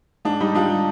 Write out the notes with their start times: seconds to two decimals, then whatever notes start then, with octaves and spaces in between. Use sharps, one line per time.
0.25 G#2 D4
0.40 G3 D#4
0.55 G3 D4 F4
0.70 D#4